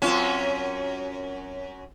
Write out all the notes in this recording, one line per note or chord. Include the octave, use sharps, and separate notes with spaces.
F#2 C4 C#4 F4 A5